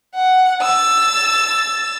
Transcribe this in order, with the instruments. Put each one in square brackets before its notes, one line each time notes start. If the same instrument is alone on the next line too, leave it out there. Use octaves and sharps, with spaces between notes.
[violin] F#5
E6 A6